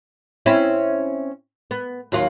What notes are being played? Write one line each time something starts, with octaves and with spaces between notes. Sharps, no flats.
C4 C#4 E4
B3
D#2 F#3 F4